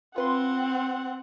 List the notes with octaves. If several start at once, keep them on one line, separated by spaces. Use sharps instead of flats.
C4 F4 B4 F#5 C6